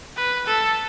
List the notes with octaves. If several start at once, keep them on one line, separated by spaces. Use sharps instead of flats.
B4
A4